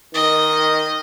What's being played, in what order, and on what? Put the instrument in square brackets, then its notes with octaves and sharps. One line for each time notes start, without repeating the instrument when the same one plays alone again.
[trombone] D#3 [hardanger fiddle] D#5